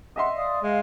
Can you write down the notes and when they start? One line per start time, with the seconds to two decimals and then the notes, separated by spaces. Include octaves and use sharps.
0.16 D#5 E5 F#5 C6
0.36 D5 F5 D#6
0.63 G#3 F5